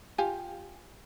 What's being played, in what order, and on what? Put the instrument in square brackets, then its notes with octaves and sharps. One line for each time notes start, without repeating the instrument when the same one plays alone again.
[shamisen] F4 G4 G#5